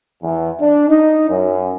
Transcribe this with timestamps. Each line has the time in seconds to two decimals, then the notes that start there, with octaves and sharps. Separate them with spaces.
0.22 E2
0.60 D4
0.89 D#4
1.30 F#2